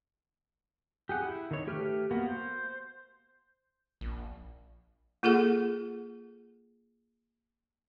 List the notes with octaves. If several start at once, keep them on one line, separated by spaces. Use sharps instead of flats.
G4 G#4 F#5
E4
D#3 C#5
A3 G4 B4 F6
A#3 B3 F#4
C5
A#1
A#3 F4 G#4 A4 F#5